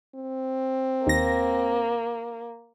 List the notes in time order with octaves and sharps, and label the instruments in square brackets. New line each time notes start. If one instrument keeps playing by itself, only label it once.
[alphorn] C4
[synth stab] D#2 A#6 [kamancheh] A#3